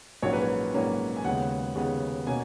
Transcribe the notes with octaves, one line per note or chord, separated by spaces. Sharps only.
A#1 G#2 F#3 A#3 C#4 C#5
B4
C#5
A#1 G#2 F#3 A#3 C#4
G#5
D#2 C#3 G#3 B3 F#5
D#2 C#3 G#3 B3
B2 A#3 C#4 G#5